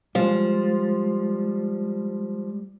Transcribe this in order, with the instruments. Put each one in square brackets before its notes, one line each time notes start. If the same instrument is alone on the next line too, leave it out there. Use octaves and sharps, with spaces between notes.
[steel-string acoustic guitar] F3 [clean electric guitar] G3 G#3